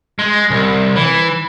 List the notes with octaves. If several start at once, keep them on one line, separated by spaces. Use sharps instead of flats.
G#3
C2
E3